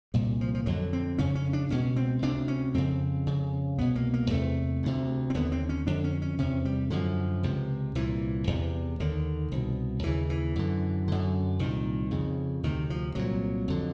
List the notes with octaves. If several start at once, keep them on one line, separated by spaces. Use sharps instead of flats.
C2 A#2 G3
F3
F3
F2 D3 F#3
C4
F2 C#3 C#4
C#4
D4
C#2 B2 C#4
C4
D2 C3 D4
C#4
F2 C#3 C4
F2 C#3
C2 B2 B3
A#3
A#3
E2 C3 A3
D2 C3
C4
D#2 D3 B3
C4
C#4
F2 D3 D4
C#4
C#4
E2 C3 C#4
G3
F#2 D3 F3
C#2 C3
C2 A#2 E3
E2 C3
D#2 D3 D#3
C2 B2
D#2 C#3 E3
E3
F#2 D3
F#2 D3
C2 A#2 D#3
F2 C#3
D2 C3 D#3
F3
C2 A#2 F#3
F2 D3